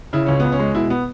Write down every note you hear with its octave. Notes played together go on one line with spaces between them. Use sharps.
C#3 E4
C#2 C#4
C#2 B3
C#4
G#3
B2 E4
B3